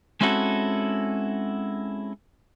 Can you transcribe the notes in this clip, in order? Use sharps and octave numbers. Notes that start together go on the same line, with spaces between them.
G#3 C4 C#4 E4 F#4 A4